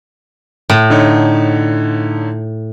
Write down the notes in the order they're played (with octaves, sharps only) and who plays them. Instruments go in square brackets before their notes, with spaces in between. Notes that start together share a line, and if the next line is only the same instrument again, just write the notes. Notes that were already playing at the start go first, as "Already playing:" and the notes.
[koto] A2
[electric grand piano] D3 D#4 C#5